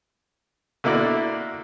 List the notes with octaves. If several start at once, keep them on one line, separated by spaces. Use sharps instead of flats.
D3 A#3 E4 F#4 D5